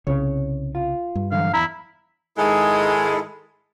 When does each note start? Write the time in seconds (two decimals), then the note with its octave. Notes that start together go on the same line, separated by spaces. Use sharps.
0.07 C2 C#3 C#5
0.75 F4
1.15 G2
1.32 D3 E3 F#3 F5
1.54 E2 E4 A#5
2.37 G#2 D#3 G#3 E4 G#4 A4